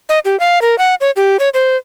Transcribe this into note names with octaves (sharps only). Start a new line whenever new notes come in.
D#5
G4
F5
A#4
F#5
C#5
G4
C#5
C5